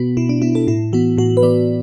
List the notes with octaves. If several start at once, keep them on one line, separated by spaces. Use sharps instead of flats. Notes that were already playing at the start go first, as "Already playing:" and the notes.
Already playing: B2 B3 F#4
B2 E4
D4
B3 E4
A4
A2 E4
E3 B3 F#4
A2 F#4
B4
E3 B3 D5